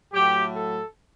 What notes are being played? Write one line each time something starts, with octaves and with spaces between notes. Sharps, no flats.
A2 F#3 A3 G4
A4